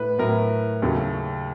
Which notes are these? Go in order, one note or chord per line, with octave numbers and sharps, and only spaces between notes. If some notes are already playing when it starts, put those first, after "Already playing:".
Already playing: A2 A3 B4
A2 F#3 A3 A#4
D#2 C#3 F#3 A3